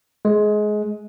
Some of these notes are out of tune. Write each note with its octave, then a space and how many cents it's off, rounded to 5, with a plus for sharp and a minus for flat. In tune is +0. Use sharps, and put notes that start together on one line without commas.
G#3 +20